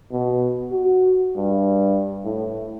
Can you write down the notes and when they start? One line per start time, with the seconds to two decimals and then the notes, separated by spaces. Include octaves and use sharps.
0.12 B2
0.72 F#4
1.36 G2
2.25 A2